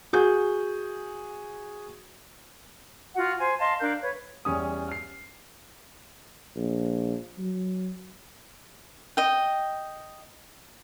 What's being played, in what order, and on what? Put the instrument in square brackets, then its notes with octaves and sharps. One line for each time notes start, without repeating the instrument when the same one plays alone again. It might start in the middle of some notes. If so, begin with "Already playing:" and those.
[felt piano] F#4 G#4 G6
[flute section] F4 F#4 F#5
C5 G#5
D#5 F5 A5 C6
D4 A#4 F5 G6
B4 C#5
[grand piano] E2 G3 C#4 D#6
F6 C7
[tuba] A#1
F#3
[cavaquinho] D#5 G5